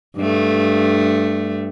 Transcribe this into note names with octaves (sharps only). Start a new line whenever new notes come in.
G2 A3